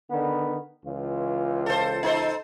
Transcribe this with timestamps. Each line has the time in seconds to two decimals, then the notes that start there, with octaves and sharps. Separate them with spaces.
0.10 D3 D#3 B3
0.85 C#2 E3 F4
1.66 A4 C5
2.03 D#4 A4 C5